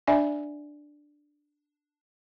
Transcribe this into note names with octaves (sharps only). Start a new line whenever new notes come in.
D4 D5 E5 G#5